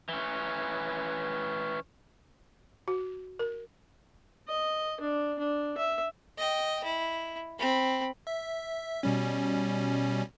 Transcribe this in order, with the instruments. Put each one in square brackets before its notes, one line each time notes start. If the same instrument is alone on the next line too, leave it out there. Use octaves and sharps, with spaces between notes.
[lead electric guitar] E3 C#4
[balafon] F#4
A#4
[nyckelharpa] D#5
D4
D4
E5
[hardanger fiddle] D#5 G5
E4
C4 B5
[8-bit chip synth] E5
B2 G3 C#4